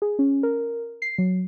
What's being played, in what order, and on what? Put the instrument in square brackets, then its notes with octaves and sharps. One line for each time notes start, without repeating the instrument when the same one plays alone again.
[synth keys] G#4
C#4
A#4
C7
F#3